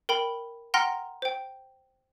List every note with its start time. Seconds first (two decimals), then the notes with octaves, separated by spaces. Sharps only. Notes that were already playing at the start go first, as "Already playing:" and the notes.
0.09 A#4 G5 B5
0.74 F#5 G5 A#5 C6 F6 A#6
1.22 C5 G5